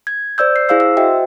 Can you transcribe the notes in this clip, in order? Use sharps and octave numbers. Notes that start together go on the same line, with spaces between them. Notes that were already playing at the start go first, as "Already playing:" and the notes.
G#6
C5 D5 E6 G6
C7
E4 G#4 C5 F5 E6 C7
E6
F#4 C5 D#5 E5 G5